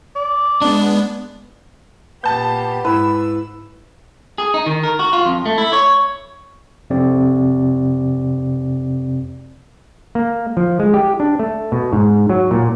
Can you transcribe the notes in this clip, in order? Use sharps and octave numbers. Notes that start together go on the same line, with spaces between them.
D5
G#3 B3 D4
A#2 B3 G4 A5 G6
G#2 E4 B4 E6
G#4
D#4
D#3
A#4
F#4
F4
F2
A3
E4
C#5
F2 C3 C4 D5
A#3
F3
G#3
G4
D4
A3
B2
G#2
F#3
A#2